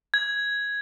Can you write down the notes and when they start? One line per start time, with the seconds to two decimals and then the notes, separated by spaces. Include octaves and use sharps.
0.14 G#6